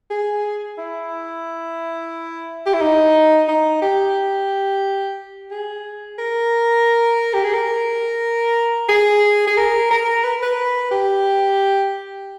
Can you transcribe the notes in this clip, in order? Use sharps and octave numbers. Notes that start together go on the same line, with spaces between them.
G#4
E4
G4
E4
D#4
D#4
G4
G#4
A#4
G4
G#4
A#4
G#4
G#4
A#4
A#4
B4
B4
G4